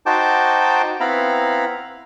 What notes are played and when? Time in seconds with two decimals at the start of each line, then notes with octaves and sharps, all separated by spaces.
0.06 D#4 F#4 C5 G5 A5 D6
1.00 B3 C4 E4 F5 A#5 B5